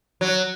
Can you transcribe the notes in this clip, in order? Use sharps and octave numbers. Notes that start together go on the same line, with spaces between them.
F#3